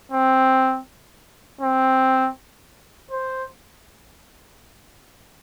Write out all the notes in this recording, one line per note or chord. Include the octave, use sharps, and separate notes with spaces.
C4
C4
C5